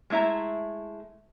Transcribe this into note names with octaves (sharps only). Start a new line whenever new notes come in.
G#3 A3 E4 E5 A#5